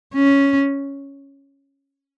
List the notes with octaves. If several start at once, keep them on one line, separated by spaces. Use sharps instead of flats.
C#4